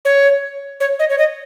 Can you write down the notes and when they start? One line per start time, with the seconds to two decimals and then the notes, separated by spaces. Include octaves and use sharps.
0.05 C#5
0.80 C#5
0.99 D#5
1.10 C#5
1.18 D#5